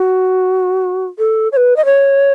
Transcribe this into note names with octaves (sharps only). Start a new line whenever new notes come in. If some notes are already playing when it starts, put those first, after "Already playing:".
Already playing: F#4
A4
C#5
B4
D#5
C#5